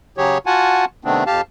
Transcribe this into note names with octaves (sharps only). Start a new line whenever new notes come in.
C#3 F#3 G4 G#4 C#5
F4 F#4 F#5 G#5 A5
C3 D#3 A3 B3 C4 D4
F2 G4 F5 A5